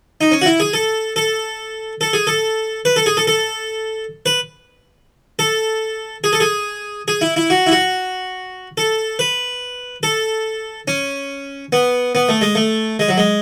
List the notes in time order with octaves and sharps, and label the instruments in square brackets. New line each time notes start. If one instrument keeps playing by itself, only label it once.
[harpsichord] D#4
C#4
F#4
E4
G#4
A4
A4
A4
G#4
A4
B4
A4
G#4
A4
A4
B4
A4
G#4
A4
G#4
G#4
E4
E4
F#4
E4
F#4
A4
B4
A4
C#4
B3
B3
A3
G#3
A3
G#3
F#3
G#3